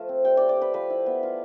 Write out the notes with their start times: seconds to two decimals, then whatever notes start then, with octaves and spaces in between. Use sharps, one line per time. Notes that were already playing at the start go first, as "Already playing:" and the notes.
Already playing: F3 A3 F4
0.09 C4
0.25 G3 G5
0.37 G3 D5
0.49 D5
0.57 G3 B4
0.73 F3 B4
0.90 E4
1.06 B3
1.23 F4